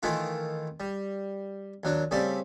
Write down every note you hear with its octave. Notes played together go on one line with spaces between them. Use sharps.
D#3 E3 A3 E4 F4
G3
D#2 F#3 D4
C#3 G3 A3 C4 D5